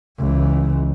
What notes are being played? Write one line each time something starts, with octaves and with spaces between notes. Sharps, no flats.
C#2 E3